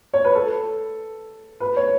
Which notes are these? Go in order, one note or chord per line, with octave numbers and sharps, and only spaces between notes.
C#5
B4
A4
B4
C#5